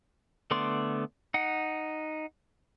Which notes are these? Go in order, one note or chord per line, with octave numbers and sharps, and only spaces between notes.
D3 A3 B3 D5 C6
D#4 F#5